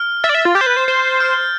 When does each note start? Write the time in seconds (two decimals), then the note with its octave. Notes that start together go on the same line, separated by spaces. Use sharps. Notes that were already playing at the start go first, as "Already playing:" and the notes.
Already playing: F6
0.24 E5 A6
0.29 D5
0.34 E5
0.45 F4
0.55 G4 G6
0.61 C5
0.66 B4
0.77 C5
0.88 C5
1.20 F6